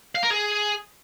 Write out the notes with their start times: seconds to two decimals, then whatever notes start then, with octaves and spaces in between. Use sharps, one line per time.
0.15 F5
0.23 A#4
0.31 G#4